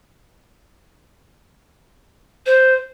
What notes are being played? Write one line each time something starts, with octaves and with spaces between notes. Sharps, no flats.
C5